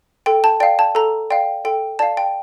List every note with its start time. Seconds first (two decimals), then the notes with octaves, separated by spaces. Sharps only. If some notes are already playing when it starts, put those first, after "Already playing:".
0.26 A4 G5
0.44 A5
0.60 D5 F5 G5
0.79 A5
0.95 A4 A#5
1.30 D5 F5 G5
1.65 A4 G5
1.99 D5 F5 A5
2.17 G5